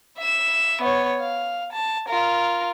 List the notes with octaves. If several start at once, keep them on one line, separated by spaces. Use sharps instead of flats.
E5 E7
B3 C#5
F5
A5
F4 A#4